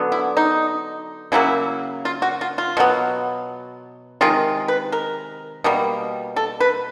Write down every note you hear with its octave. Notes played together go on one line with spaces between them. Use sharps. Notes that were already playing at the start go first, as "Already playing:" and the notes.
Already playing: D3 F#3 B3
E4
D#4
C#3 F#3 A#3 E4
F4
F#4
F4
F4
B2 F#3 B3
C3 D#3 G#3 F4
B4
A#4
B2 G3 A#3
A4
B4